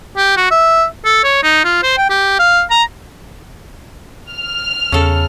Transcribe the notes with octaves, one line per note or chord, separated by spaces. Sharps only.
G4
F#4
E5
A4
C#5
D#4
F4
C5
G5
G4
F5
A#5
F6
E2 C#3 A4